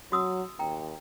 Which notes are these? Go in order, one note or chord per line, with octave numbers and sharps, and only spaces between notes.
F#3 F#4 D#6 E6
D#2 G5 A#5